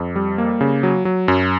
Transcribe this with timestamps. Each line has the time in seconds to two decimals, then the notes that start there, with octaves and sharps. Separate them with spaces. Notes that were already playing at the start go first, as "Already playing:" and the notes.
Already playing: F2
0.16 G3
0.38 A#3
0.61 C#3
0.83 F#3
1.05 F#3
1.28 F#2